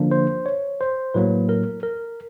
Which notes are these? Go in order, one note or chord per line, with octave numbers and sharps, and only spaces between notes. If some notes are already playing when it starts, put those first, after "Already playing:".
Already playing: D3 F3 A#3 D4
C5
C#5
C5
A2 F#3 A#3 B4
A#4
A#4